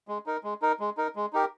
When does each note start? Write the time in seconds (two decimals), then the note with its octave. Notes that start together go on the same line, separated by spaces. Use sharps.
0.08 G#3
0.26 D#4 A#4
0.44 G#3
0.62 D#4 A#4
0.80 G#3
0.97 D#4 A#4
1.16 G#3
1.33 D#4 G4 A#4